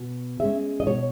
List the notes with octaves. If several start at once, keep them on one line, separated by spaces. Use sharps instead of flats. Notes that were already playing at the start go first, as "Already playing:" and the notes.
Already playing: B2
G#3 C#4 E5
D#5
B2 C#5